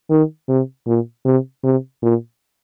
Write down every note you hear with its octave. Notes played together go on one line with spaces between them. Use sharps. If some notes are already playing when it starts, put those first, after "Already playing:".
D#3
C3
A#2
C3
C3
A#2